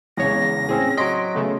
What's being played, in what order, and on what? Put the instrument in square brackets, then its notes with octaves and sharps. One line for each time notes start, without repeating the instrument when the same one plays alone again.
[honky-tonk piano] E2 C#3 [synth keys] G#3 G#4 C#5 [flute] A#6
[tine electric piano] A2 C4 C#4 [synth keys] G#4
[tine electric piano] F#3 C#5 D#5 [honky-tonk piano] C6 [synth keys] B6 D7
[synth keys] C#3 A3 B3